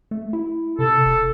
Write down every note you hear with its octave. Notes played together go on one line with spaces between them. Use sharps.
A3
E4
C3 A4
E1